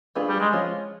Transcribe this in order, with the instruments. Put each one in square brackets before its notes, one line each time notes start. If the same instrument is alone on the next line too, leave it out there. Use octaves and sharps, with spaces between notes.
[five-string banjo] A3 D4 F4 G#4 B4
[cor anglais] G3
G#3
[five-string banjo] F3 G#3 C#4 F4